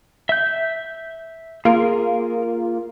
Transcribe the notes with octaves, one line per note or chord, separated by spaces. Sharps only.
E5 G6
A#3 F4 G#4 A#4